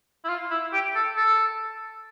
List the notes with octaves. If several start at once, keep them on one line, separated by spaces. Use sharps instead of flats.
E4
F4
E4
G4
A4
A4